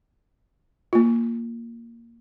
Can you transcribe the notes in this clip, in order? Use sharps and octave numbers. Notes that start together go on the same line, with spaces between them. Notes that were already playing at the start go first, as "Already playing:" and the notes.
A#3 F4